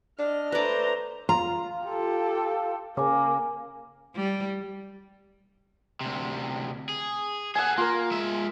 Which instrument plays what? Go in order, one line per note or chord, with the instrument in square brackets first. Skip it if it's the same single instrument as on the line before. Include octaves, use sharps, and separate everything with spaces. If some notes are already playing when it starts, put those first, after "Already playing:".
[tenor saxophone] D4 [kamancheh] D#5 F6
[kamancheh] A3 C5 [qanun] B4 D5 [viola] A#5
[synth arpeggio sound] F4 [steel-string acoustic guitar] A#5
[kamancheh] G4 A4
[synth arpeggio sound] C#3 [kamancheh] A#3 [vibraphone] G#5 D6
[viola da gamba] G3
[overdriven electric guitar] D2 C3
G#4
[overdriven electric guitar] G#4 A4 [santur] F#5 G#5
[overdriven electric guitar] A#3 [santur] F4 A#4
[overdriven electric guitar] G#3 E5